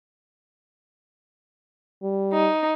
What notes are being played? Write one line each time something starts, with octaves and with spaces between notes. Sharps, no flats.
G3
D#4